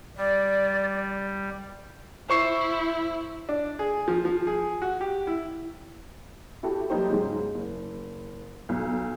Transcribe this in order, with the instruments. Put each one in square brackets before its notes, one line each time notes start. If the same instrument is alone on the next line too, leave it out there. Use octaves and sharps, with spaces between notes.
[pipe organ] G3 [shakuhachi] D5
[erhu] E4 [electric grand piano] C5 C#6 C7
[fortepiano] D4
G#4
F3
F3
G#4
F#4
G4
E4
[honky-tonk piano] E4 F#4 G4 A4
F#3 G3 A#3 D#4 G4 C5
G#2 C#3 F#3 G#3
F#1
B1